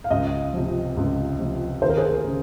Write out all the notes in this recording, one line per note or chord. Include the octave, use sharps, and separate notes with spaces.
F5
C#2 D#5
C3 F3
C#2
C3 F3
D#2 C5
A#4
G#4
A#4
C#3